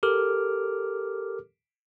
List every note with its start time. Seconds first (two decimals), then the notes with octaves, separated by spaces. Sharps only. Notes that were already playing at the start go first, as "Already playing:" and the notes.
0.03 G4 A4 A#4 D6 F6